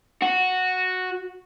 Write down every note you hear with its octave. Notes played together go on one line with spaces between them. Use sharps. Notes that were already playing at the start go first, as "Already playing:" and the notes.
F#4